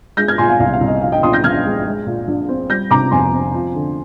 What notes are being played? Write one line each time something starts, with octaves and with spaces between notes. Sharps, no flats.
G#3 G6 A#6
F6 G#6
A#2 G#5 C6
F5 G#5
C2 F5 G#5
F5
C2
D#5
F3 F5
D#5 G5
A#2 C6 D#6
G6 A#6
A#1 F6 G#6
G#3
G#3
A#2
A#1
C4
G3 G6 A#6
C3 A#5 D6
F2 G#5 C6
C4
F3
D3